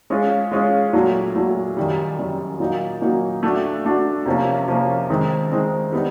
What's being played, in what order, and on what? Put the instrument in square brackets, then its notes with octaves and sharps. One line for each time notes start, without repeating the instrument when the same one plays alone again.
[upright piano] G#3 C#4 F4 G#4
G#3 C#4 F4 G#4
A#2 F#3 A3
A#2 F#3 A3
F#2 D#3 G3
F#2 D#3 G3
A#2 F#3 A#3 D#4
A#2 F#3 A#3 D#4
A3 D4 F#4
A3 D4 F#4
C3 F3 A#3 C#4
C3 F3 A#3 C#4
D#3 G#3 C4
D#3 G#3 C4
G3 B3 D#4